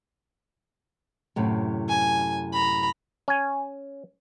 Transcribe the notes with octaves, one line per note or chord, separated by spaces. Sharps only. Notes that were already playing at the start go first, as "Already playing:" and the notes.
F#2 A2 C3
G#5
A#5 B5
C#4 G#5